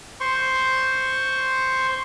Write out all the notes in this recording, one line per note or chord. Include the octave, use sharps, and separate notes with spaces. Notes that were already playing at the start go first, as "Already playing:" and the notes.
C5 C6 C#6